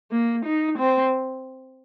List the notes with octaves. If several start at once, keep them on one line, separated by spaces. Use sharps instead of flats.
A#3
D#4
C4